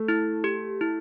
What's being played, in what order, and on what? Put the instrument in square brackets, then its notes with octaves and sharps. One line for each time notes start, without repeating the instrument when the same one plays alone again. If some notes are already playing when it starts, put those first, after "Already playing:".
Already playing: [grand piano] A3
[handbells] E4
G4
E4